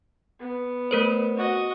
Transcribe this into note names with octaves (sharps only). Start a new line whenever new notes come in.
B3
A3 A#4 C5
F#4 D#5